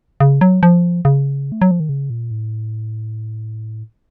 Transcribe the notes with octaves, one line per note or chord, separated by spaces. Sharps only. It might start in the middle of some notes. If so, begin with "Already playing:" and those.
C#3
F#3
F3
C#3
A3
F#3
F3
D#3
C#3
A#2
A2